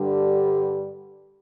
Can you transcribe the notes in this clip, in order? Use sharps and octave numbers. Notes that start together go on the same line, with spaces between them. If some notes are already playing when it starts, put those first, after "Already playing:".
Already playing: G2 D3 G3